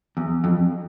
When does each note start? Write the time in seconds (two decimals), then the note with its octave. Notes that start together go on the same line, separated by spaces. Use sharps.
0.17 E2
0.44 F2